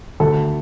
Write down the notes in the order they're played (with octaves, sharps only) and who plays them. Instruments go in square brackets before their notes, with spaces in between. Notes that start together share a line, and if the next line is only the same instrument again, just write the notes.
[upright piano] D2 A4